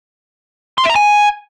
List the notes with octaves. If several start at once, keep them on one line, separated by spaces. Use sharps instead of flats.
C6
E5
A#5
G#5